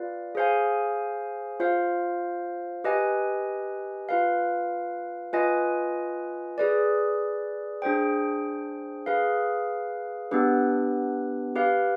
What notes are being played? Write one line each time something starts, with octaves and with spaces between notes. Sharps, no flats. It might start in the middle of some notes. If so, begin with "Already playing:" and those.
Already playing: F4 B4 D5 F5
G#4 C5 F5 G#5
F4 C5 F5
G4 B4 D#5 G#5
F4 B4 F5
F4 B4 D#5 G#5
G#4 B4 D5
D4 G#4 C5 G5
G#4 B4 F5
B3 D4 G4 B4
G4 B4 F5